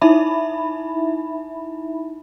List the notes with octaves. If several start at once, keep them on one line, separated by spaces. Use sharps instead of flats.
D#4 E4 E5 B5